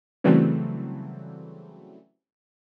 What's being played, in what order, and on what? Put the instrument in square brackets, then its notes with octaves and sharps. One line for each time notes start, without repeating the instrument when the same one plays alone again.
[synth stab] C#3 E3 F#3 G3 A3 C4